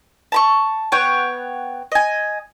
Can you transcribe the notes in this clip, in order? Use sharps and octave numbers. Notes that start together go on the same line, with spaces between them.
A5 B5 C#6
B3 C#5 F#5 G5
D#5 G#5